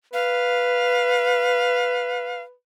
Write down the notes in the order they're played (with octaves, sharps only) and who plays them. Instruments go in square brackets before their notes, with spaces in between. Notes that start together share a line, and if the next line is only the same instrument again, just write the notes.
[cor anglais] B4 [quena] F5